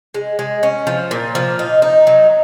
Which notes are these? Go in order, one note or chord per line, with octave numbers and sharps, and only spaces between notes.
G#3
G#3
C#4
F3
A#2
F3
D#4
D#4
F#3